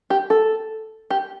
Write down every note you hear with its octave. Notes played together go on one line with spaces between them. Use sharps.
G4
A4
G4